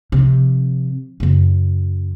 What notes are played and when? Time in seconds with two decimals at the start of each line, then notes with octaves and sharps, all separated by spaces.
0.12 C3 F3
1.20 F#2 C#3